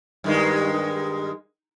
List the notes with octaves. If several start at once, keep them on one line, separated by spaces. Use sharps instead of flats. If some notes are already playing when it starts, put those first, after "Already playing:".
G2 D#3 G#3